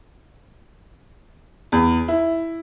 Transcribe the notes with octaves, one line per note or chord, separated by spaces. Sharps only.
E2
E4